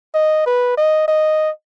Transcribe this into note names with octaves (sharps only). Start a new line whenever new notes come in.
D#5
B4
D#5
D#5